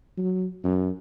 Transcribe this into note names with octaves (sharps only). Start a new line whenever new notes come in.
F#3
F#2